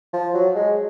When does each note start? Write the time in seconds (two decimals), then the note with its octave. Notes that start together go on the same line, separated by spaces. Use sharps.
0.13 F3
0.34 F#3
0.55 G#3